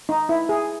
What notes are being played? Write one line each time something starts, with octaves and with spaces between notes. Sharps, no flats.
D#4
E4
G#4